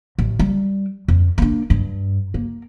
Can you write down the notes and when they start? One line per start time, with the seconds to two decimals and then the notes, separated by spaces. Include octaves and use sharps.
0.19 A1
0.39 G3
1.08 F2
1.38 A#3 D4
1.70 G2
2.34 A#3